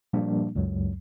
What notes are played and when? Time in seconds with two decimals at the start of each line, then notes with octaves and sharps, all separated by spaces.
0.13 A#2 F3 G3 A#3 D4
0.56 C#2 F#2 F#3